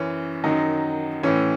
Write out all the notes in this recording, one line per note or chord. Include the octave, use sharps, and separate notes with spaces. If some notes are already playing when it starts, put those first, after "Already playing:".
Already playing: F#2 E3 C#4
F#2 D#3 F#3 D#4
A2 E3 C#4